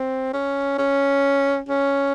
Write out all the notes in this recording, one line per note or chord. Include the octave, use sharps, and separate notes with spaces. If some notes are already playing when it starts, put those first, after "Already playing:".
Already playing: C4
C#4
C#4
C#4